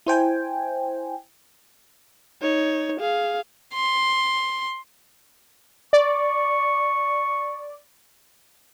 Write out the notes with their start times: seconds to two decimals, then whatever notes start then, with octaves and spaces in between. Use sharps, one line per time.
0.06 E4 C5 G5 G#5
2.42 D#4 C#5
3.00 G#4 F5
3.74 C6
5.93 D5 C#6